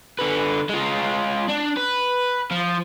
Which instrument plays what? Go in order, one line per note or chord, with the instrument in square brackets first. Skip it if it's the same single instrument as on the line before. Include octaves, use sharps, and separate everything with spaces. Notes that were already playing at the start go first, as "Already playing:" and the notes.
[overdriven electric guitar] D3 B4
G#3 F4
D4
B4
F3